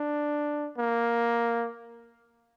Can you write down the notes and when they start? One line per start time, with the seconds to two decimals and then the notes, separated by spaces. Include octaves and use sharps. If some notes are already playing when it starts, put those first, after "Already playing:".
Already playing: D4
0.78 A#3